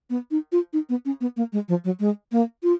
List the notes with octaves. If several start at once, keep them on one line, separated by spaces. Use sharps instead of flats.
B3
D#4
F4
D#4
B3
C#4
B3
A#3
G#3
F3
F#3
G#3
A#3
F4